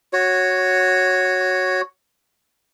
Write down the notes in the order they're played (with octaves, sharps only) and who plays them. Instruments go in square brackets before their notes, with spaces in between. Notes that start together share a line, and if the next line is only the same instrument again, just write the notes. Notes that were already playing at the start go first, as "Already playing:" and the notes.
[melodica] F#4 C#5